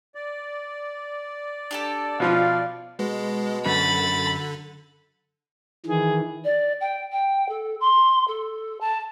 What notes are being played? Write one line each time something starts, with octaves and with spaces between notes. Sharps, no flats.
D5
D4 G4 A4
B2 F3 F4 F5
B2 G#3
F#2 D3 B5 A6
D#3 E3 G#4
D5
G5
G5
A4
C6
A4
A5